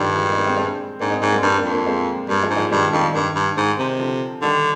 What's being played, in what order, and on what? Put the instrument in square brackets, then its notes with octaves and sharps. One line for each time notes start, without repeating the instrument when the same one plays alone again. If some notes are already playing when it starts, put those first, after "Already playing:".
Already playing: [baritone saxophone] G2 [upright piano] D3 D#3 F3 G3
[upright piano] F3 G#3
G3 A#3
D#4
A#3 D4
G#3 C4
G#3 C4
[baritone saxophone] G#2 [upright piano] A#3 D4
[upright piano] C4 D#4
[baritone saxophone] G#2 [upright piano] A#3 D4
[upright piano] G3 A#3
[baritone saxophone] G2 [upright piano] A#3 D4
[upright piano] A#3 D4
[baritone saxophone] F2
[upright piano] A#3 D4
G#3 C4
[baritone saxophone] G2 [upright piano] G3 A#3
[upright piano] F3 G#3
[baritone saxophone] G#2
[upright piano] F3 G#3
[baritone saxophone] G2 [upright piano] D#3 G3
[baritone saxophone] F2 [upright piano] D#3
[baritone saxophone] G2 [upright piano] D#3
[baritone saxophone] G2
G#2
C3
[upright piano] D3 F3
[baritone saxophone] D3 [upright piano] D#3 G3